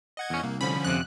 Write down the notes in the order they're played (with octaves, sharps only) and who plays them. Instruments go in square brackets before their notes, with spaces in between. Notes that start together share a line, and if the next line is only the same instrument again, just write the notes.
[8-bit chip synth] D#5 F#5 G#6
[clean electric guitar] E2 C#4
[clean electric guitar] C2 [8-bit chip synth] A#3
[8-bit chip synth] D3 F3 C#4 [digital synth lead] B5
[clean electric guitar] F2 C3 [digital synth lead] F#6